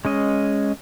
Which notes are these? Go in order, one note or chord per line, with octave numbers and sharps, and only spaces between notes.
G#3 C#4 D#5